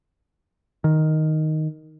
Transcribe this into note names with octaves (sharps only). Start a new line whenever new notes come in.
D#3